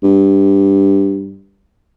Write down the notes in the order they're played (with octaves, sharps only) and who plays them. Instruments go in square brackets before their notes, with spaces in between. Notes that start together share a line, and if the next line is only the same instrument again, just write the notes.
[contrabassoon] G2